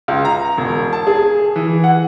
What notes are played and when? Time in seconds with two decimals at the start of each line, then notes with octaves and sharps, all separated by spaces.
0.08 C#2
0.25 A#5
0.57 E1
0.93 A5
1.07 G#4
1.56 E3
1.84 F#5